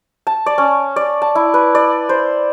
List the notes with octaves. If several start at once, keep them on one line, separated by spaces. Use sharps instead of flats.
A5
D5
C#4
D5
A5
E4
B4
D5
C5